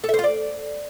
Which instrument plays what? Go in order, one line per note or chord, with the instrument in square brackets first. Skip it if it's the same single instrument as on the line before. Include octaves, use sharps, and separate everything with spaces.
[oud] A4
E5
C5
F4
D5